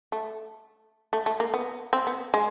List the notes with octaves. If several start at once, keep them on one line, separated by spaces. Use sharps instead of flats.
A3
A3
A3
A#3
B3
C4
B3
G#3